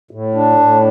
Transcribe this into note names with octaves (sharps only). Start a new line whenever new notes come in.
A2
D4
A2